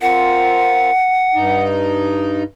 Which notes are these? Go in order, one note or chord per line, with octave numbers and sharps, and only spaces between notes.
C4 F4 A#4 F#5
G2 D#4